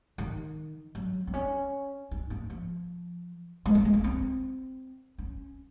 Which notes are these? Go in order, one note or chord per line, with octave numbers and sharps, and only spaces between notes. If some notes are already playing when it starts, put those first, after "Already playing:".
D#3
F#3
C4
C#4
D#4
A#3
F3
G#3
A#3
G#3
A#3
C4
C#4